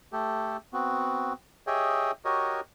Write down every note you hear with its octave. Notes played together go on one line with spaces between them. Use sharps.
A3 G4 A4
B3 C4 F#4
G4 G#4 C#5 D#5 E5 G5
F#4 G4 A#4 C#5 D#5